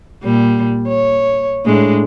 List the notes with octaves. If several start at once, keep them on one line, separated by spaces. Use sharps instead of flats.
A#2 G3
C#5
A2 G#3 D4